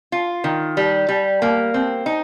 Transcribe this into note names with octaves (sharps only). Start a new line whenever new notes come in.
F4
D#3
G3
G3
A#3
C4
D#4